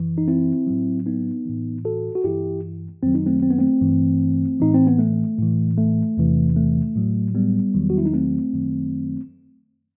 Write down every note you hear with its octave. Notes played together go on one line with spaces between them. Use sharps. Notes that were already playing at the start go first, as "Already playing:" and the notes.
Already playing: F#2 E3
D#4
C4 E4
A2 F#3
B3 D#4
A2 E3
F#4 A4
F#4
G2 E3 E4 G4
F#2 D#3 F#3 C4
D#4
A3 C4
C4
B3
A3 C4
G2 E3
A2 E3 D#4
C4
B3
A3
A2 E3
A3
E2 C3 E3
A3
A2 F#3
G3 B3
E2 D#3 F#3
F#4
E4
D#4
A3 C4
F#2 D#3 F#3